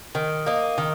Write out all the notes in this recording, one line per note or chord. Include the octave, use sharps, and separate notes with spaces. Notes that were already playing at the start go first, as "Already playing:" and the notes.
D#3
A#3 D#4
D#3